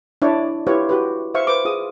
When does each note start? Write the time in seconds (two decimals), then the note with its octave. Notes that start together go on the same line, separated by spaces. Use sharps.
0.22 D4 E4 C#5 D5 E5
0.67 E4 F4 G4 B4 C#5
0.89 F#4 G4 B4
1.34 C5 E5 F5 C#6
1.47 B4 C5 D6
1.65 F4 G#4 D#6